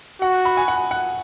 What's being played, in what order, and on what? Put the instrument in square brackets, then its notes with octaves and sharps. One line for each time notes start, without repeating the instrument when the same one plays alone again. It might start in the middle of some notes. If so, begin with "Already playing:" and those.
[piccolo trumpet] F#4 [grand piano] F#5
[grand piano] B5
G#5
F#5
F#5